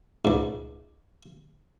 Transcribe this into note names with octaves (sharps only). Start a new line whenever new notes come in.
C#2 G#2